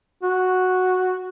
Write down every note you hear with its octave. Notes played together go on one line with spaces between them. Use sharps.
F#4